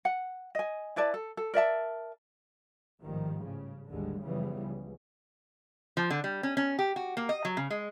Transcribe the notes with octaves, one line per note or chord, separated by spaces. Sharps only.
F#5
D#5 G#5
E4 B4 D5 A5
A4
A4
A#4 D5 E5 A5
A1 G#2 D#3 F3 G3
C#3
A1 D#2 D3 G3 G#3
F#2 C#3 E3 F3 G3 B3
C#2
F3
D3
G3
C#4
C#4
G4
F#4
A#3
D#5
F#3
C#3
G#3